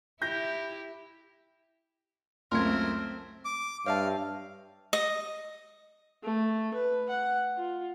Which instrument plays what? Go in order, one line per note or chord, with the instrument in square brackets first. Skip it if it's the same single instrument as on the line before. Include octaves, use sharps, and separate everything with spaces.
[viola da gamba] E4 G4 [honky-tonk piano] G6 A#6
[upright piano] C#2 F#2 [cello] A3 C4 [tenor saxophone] A#4 [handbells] C6 G#6
[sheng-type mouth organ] D6
[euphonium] G2 [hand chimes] C#5 E5 A5 [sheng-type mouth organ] F5
[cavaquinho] D#5
[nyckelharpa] A3
B4
F#5
F4